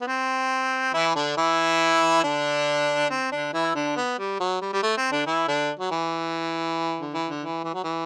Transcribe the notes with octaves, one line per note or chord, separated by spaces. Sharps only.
B3
C4
E3 E4
D3 D4
E3 E4
D3 D4
C4
D3 D4
E3 E4
D3 D4
B3
G3
F#3
G3
G3
A3
C4
D3 D4
E3 E4
D3 D4
F#3
E3
D3
E3
D3
E3
E3
F#3
E3